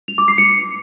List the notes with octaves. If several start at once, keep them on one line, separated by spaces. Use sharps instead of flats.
F7
D6
C7
C#7